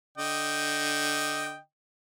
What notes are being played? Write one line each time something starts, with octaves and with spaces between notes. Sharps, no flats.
D3 D#5 G5